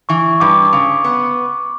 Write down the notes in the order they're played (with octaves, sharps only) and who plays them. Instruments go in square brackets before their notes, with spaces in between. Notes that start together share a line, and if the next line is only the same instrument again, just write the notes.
[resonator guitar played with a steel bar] E3 [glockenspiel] C#6
[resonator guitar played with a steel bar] G2 [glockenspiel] D6
[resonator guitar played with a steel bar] C#3
B3